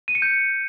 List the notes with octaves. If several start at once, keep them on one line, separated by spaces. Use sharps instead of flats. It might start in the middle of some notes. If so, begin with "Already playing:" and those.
D#7
C#7
G6